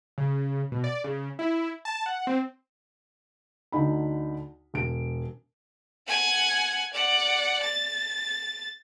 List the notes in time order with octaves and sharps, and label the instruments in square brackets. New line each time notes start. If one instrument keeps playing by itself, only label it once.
[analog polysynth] C#3
B2
D5
C#3
E4
A5
F#5
C4
[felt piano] D2 D3 D#4 B5
E1 D7
[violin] F#5 G#5
D5 F#5
A6